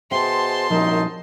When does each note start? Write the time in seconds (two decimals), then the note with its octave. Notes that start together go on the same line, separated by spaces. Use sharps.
0.11 B2 G#4 C5 E5 G5 A5 C6
0.70 C2 F#2 A#2 F3 D#4 A4